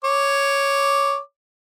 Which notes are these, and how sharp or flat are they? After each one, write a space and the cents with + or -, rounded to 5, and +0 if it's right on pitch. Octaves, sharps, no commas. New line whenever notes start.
C#5 +0 D6 +0